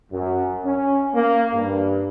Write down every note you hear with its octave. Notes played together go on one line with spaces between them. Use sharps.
F#2
C#4
A#3
G2